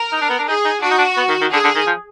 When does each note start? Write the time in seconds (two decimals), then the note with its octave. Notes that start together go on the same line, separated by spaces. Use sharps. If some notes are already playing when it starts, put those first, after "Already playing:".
Already playing: A#4
0.12 D#4
0.21 D4
0.30 B3
0.38 D4
0.48 D#4 G#4
0.65 D#4
0.82 D4 F#4
0.91 D#4
0.98 D4
1.17 B3
1.29 D#3
1.41 D#3
1.52 D3 G#4
1.64 D3
1.75 D#3
1.87 F3